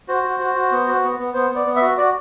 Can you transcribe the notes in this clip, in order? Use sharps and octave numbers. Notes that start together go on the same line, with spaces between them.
F#4 C5
F#4
F#4
F#4
B3
F#4
B3
B3
B3 C5
B3
D5
B3
E5
F#4
F#4 D5